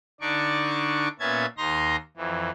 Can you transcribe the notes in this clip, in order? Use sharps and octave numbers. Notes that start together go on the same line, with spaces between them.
D3 D4 D#4 D5 C#6 D6
A#2 B3 C#4 E5 A5 G#6
D#2 D#4 A#5 C6 A#6
F2 E3